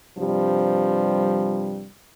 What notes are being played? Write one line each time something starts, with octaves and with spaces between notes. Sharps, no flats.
G2 C3 F3 G3